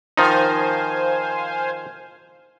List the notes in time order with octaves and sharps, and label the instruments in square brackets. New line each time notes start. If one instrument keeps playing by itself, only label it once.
[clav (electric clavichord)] D#3 F3 D#4 [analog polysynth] C5 F5 G#5